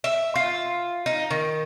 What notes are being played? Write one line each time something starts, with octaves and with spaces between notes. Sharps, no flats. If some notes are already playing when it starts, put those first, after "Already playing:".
E5
F4
D#4
D#3